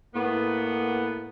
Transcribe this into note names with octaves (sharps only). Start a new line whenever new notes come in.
A2 A#3 B3